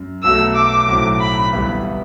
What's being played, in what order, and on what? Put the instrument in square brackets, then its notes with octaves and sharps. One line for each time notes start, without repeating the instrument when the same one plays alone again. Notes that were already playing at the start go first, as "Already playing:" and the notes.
Already playing: [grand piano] F#2
[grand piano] B1 B2 F#3 A3 [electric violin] E6
[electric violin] D6
[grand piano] B1 A2 F#3 A3 C4
[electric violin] B5
[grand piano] G1 G2 E3 B3 E4